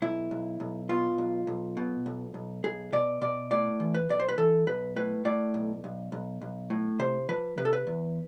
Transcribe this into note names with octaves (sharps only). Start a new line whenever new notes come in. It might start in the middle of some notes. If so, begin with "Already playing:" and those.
B1 E4
B1
B1
B2 F4
B1
B1
B2
B1
B1
B1 G#4
B2 D5
B2 D5
A2 D5
E3
B4
B1 D5
C5
B4
E3 A4
B1 B4
A2 B4
A2 D5
B1
B1
B1
B1
A2
C3 C5
F3 B4
C3 B4
A4
B4
E2